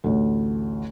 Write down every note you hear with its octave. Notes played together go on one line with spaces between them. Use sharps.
A1 D2